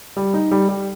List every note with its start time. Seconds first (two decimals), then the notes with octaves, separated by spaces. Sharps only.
0.17 G3
0.34 D#4
0.51 G3
0.69 G3